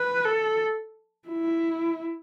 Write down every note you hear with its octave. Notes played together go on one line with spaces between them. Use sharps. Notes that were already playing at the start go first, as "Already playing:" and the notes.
Already playing: B4
A4
E4